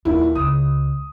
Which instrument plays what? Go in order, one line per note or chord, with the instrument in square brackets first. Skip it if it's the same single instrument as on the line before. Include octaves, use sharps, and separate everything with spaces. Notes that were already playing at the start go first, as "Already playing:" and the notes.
[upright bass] D#2 [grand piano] A#2 E3 E4
[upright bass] C#2 [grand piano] D#6